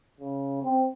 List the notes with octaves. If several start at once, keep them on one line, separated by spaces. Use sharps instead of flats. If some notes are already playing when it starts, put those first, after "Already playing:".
C#3
C4